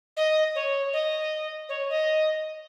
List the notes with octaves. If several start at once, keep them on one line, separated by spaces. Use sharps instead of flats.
D#5
C#5
D#5
C#5
D#5